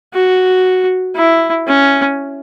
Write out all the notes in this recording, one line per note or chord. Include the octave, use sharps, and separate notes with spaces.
F#4
E4
C#4